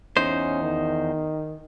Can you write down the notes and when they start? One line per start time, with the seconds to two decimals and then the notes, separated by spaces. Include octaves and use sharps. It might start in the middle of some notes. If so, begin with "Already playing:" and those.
0.17 E2 C#4 D#4 C5
0.63 D#3